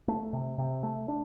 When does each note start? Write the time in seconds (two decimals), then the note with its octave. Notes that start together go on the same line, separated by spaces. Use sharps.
0.08 A3
0.33 C3
0.58 C3
0.83 A3
1.08 D4